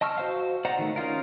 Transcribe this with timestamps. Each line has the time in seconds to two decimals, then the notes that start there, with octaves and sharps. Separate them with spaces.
0.01 D#5 A5 C#6 E6 F6
0.18 F#4 C5 F5
0.65 C5 D5 D#5 F#5 A#5
0.79 D#3 A3
0.96 C#4 D#4 F4 A#4